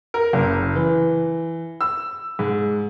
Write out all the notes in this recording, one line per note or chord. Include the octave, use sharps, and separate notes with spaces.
A#4
F#1
E3
E6
G#2